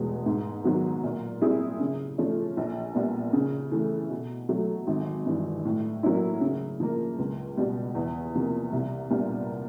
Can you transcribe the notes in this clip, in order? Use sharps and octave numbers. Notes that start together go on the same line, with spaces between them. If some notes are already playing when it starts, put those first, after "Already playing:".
Already playing: F1 E2 B2 G#3
G#2
D#3 F#3 B3
A#2
G3 C4 E4 G#4
C#3
F3 A3 C#4
A#1
A#2 G3 B3
C#3
E3 A3
B2
F#3 A3
G#1
G2 E3
A2
F#3 A#3 C#4 E4
C#3
F3 A#3
C#2
B2 G3
E2
C3 F3 A#3
C2
A#2 G3 B3 D4